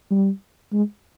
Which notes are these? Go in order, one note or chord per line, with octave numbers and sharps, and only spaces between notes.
G3
G#3